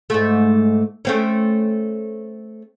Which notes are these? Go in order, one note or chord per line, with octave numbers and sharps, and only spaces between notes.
G#2 A3
A3 C4 C#4